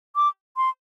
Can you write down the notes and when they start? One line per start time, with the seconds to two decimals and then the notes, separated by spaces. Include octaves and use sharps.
0.16 D6
0.57 C6